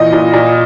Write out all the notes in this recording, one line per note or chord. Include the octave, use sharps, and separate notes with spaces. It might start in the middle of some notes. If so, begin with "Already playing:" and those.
Already playing: A#2 E3 D#5
A#2
A#2